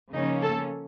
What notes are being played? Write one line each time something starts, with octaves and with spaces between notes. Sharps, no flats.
C#3 F3 A#3 C#4 D#4
A4